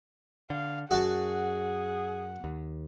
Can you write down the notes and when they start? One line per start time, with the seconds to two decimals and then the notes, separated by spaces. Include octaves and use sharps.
0.50 D3 F5
0.91 F#2 F#4 G#4 F#5 A5
2.44 D#2